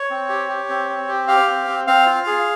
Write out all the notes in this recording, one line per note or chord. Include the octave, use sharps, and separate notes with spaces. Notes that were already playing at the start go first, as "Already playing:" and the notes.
Already playing: C#5
C4
G4
G4
C4
C4
G4
G4 F5
C4
C4
C4 F5
F4
G#4